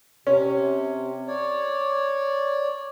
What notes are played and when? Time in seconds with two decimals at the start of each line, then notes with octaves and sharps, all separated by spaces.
0.27 C3 C#4
1.27 C#5 D5